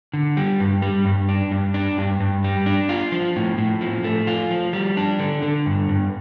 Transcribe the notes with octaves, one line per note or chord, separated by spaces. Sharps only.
D3
G3
G2
G3
G2
D4
G2
D4
G2
G2
G3
D4
F4
F3
A2
A2
F3
A3
F4
F3
G3
D4
D3
D3
G2
G2